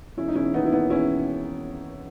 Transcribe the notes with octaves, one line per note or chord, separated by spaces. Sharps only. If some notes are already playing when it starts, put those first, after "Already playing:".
E1 C#4 E4
D#4
E1 C#4 E4
D#2 B3 D#4
E4
D#2 B3 D#4
E1 C#4 E4